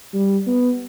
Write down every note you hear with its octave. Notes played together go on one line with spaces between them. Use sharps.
G3
B3